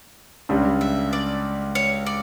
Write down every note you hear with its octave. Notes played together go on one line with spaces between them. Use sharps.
C#2 C#3 G3 D4
E5
D5
C#5
D5